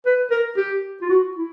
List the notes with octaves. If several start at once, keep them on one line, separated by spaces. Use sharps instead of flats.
B4
A#4
G4
F4
F#4
E4